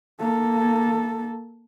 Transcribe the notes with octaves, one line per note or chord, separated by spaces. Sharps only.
A#3 A4